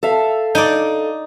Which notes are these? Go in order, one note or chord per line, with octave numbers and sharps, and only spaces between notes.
A4 E5 F5
D#4 D5